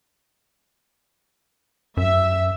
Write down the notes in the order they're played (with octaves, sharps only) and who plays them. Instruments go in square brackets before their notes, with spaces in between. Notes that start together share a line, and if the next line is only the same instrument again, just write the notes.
[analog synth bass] F#2 [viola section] E5